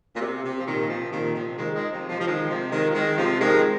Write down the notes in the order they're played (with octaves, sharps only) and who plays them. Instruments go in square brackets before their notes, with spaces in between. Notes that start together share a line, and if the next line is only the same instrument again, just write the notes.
[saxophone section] A#2
C3
C3
F3
A#2 D#3
C3 F3
C3
A#2 D#3
C3 F3
D#3 G#3
D#3 G#3
C3 F3
C3 F3
F3
D#3 G#3
C3 F3
D#3 G#3
F3
D#3 G#3
C3 F3
D#3 G#3